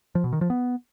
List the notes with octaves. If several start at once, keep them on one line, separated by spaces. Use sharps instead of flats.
F3
B2
D#3
F3
B3